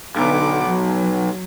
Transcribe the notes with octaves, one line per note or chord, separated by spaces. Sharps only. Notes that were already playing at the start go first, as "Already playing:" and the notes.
B1 D3 B3 D6
F#3